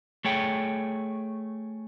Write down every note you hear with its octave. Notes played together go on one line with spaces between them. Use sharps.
A3 G#4 C#5 G5